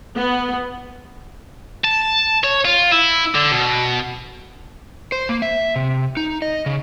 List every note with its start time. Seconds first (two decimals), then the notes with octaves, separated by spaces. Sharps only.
0.17 B3
1.85 A5
2.44 C#5
2.65 F4
2.92 E4
3.35 D3
3.51 B2
5.12 C5
5.29 A#3
5.42 E5
5.76 C3
6.17 D#4
6.42 D#5
6.66 C#3